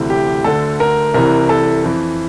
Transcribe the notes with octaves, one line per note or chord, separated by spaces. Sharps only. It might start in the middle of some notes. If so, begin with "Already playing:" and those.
Already playing: D2 C3 E3
G4
D2 D3 A4
A#4
C2 C3 E3 A#4
A4
F2 E3